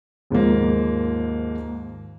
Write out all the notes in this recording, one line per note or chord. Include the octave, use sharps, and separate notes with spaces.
D#2 G#2 F3 A#3